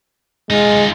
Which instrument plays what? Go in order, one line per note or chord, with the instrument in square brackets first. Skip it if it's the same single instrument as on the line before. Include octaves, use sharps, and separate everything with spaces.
[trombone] G#3 [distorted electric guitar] D#4 F4